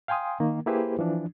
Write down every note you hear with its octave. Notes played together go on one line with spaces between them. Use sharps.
F5 G5 G#5 C6 D#6
D#3 A#3
A#3 E4 G4 G#4 B4 C5
E3 F3 D4